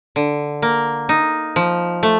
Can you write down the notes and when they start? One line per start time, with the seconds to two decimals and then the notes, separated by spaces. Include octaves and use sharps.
0.16 D3
0.62 A#3
1.09 D#4
1.56 F3
2.03 A3